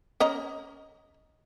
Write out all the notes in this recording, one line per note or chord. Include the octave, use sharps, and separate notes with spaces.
C#4 D#5 A#5